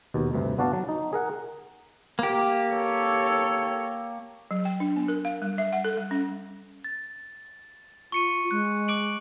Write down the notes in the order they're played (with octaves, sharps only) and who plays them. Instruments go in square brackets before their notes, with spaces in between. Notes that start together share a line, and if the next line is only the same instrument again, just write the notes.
[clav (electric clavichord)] D#2 B2
D2 G2 C3
B3 D4 F#4 D5 F5 A5
F#3 A5
D#4
G#4 A#4 F#5
[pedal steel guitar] A#3 G4
[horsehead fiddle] A4 C#5
[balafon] F#3
G5
D4
B3
A#4
F5
G3
E5
F#5
A4
G3
C#4
[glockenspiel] A6
[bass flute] F4 [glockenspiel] C#6 C#7 D#7
[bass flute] G#3 [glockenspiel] F#6
[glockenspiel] D6 D7 F#7